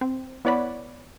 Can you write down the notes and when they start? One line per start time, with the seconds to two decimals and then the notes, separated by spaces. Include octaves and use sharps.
0.01 C4
0.45 B3 E4 C#5 D5 F#5 B5